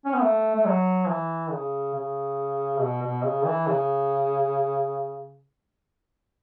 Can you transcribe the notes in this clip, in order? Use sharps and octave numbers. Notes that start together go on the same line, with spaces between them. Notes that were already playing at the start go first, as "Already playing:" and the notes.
C#4
B3
A3
A3
F#3
E3
C#3
C#3
B2
B2
C#3
E3
C#3